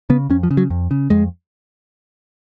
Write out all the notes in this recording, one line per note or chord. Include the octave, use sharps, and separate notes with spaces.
C#3 B3
F2 C#4
F3
C#3
F#3
F2
C#3
F2 G#3